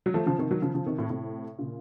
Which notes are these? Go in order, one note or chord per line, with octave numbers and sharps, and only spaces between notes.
F#3
F3 A3
C#3 F3
C3 D#3
D#3 F#3
C#3 F3
C#3 F3
C3 D#3
A2 C3
A2 C3
A#2 C#3